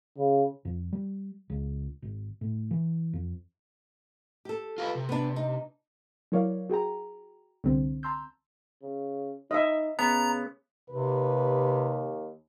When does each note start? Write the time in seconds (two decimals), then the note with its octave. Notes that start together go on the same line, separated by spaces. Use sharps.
0.18 C#3
0.65 F2
0.93 G3
1.50 C#2
2.02 G#1
2.41 A2
2.71 E3
3.13 F2
4.45 G4 A4
4.78 F4 A#4 B4
4.95 C3
5.09 B3 D4
5.36 D#4
6.32 F#3 E4 A#4 C#5 D5 F5
6.70 F#4 G#4 G5 A#5
7.64 C2 D3 G3 C4
8.03 A5 A#5 C6 E6 G6
8.82 C#3
9.51 D#4 D#5 E5
9.99 C#3 B3 A#5
10.90 D#2 C3 B4